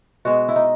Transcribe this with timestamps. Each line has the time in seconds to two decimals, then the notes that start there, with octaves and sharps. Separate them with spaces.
0.25 B2 G#3 B3 F#4
0.49 E4
0.56 D#4